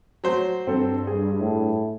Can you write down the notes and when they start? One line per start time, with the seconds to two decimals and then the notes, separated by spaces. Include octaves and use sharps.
0.24 F#3 C5
0.67 G2 C4 A4
1.07 G#4
1.40 A2